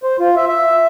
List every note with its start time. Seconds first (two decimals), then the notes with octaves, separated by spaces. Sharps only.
0.03 C5
0.20 F4
0.36 E5
0.48 E5